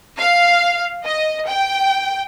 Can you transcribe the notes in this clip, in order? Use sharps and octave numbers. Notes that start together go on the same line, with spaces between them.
F5
D#5
G5